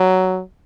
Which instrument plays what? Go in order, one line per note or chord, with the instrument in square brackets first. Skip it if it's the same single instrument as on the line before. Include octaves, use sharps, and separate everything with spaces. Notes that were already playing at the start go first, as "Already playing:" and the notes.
Already playing: [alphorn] F#3